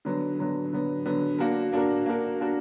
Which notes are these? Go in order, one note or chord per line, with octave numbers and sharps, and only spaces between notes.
D3 F#3 B3
D3 F#3 B3
D3 F#3 B3
D3 F#3 B3
A#3 D4 F#4 A#4
A#3 D4 F#4 A#4
A#3 D4 F#4 A#4
A#3 D4 F#4 A#4